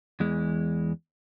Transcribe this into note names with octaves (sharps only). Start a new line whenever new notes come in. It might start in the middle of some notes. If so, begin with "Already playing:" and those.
E2 E3 G#3